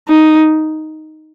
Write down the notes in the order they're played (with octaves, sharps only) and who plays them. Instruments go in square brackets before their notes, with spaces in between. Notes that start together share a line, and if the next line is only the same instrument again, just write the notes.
[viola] D#4